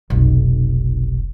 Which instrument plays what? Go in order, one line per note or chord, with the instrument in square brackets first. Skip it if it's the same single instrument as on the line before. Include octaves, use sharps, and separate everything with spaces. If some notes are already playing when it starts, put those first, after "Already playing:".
[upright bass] F1 B1